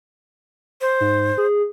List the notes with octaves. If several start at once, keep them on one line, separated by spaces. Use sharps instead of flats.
C5
G#2
G#4